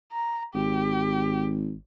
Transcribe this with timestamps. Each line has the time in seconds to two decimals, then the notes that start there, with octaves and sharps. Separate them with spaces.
0.12 A#5
0.55 G#1 G4